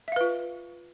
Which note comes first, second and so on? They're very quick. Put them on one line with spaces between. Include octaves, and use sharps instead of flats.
E5 F5 B4 F4